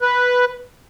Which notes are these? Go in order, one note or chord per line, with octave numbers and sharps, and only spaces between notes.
B4